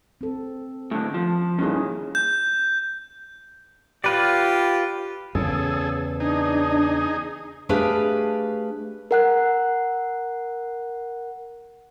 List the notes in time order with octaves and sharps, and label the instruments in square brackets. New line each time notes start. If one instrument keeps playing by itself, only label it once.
[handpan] C4 A4
[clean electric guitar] A2 D3
F3
[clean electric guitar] G2 A#2 D#3 [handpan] C#4 E4 G#4
[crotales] G6
[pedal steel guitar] F4 B4 D5 [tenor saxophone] G4
[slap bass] E2 C#3 [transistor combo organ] G#4 A4
[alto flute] D4 [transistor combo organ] D#4 G#4
[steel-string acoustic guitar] A3 D4 G4 G#4 B4 F5
[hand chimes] A#4 F#5 F#6